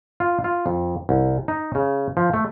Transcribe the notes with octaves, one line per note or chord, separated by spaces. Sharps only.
F4
F4
F2
C2
D#4
C#3
F3
A3